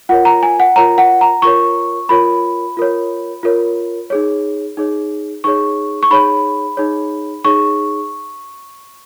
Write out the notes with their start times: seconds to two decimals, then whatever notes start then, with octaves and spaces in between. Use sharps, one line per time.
0.09 F4 A#4 C#5 F#5
0.25 A#5
0.43 G#5
0.60 F#5
0.76 F4 A#4 C#5 A#5
0.98 F#5
1.21 A#5
1.42 F4 A#4 C#5 C#6
2.09 F4 A#4 C#5 B5
2.77 F4 A#4 C#5
3.43 F4 A#4 C#5
4.10 D#4 G#4 C#5
4.77 D#4 G#4 C#5
5.44 D#4 G#4 C#5 C#6
6.03 C#6
6.11 D#4 G#4 C#5 B5
6.77 D#4 G#4 C#5
7.44 D#4 G#4 C#5 C#6